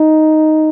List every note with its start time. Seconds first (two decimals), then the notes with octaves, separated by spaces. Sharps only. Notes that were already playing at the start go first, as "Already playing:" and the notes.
Already playing: D#4